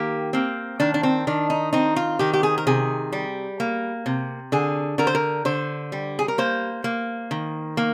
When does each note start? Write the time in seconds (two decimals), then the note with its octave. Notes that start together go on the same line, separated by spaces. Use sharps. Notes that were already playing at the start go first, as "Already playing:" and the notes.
Already playing: D#3 A#3 G4
0.33 A#3 C4
0.80 D#3 D4
0.94 D4
1.03 C4
1.27 D#3 D4
1.50 D#4
1.73 C4 D#4
1.96 F4
2.19 D#3 G4
2.33 G4
2.43 G#4
2.58 A#4
2.67 C3 G#4
3.12 G3
3.60 A#3
4.06 C3
4.52 D3 G#4
4.98 D3 A#4
5.07 C5
5.15 A#4
5.45 D3 C5
5.92 G3
6.19 G#4
6.28 A#4
6.38 A#3 C5
6.84 A#3
7.31 D#3
7.77 A#3